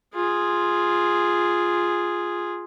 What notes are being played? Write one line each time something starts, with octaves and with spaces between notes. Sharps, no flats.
F4 G#4